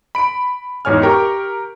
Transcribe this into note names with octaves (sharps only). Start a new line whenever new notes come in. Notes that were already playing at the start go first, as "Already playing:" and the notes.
B5 D7
E2 G#2 C#5 G#5 F6
G4 A#4 G5 C#6